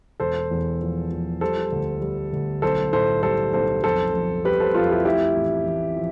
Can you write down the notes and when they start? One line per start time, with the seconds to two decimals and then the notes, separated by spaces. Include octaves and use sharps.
0.20 E1 A4 C5
0.51 E2
0.81 F3
1.11 F3
1.41 G3 A4 C5
1.72 D2
2.01 G3
2.33 D2
2.62 B1 A4 C5
2.92 A2 A4 C5
3.23 G3 A4 C5
3.53 B1 A4 C5
3.83 F2 A4 C5
4.14 F2
4.45 G3 G4 B4
4.60 A4 C5
4.74 F2 F4 A4
4.90 E4 G4
5.05 A3 E4 G4
5.36 A1
5.66 A1
5.96 F3